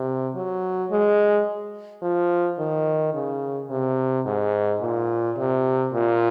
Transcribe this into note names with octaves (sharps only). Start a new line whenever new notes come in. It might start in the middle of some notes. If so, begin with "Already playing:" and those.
Already playing: C3
F#3
G#3
F3
D#3
C#3
C3
G#2
A#2
C3
A#2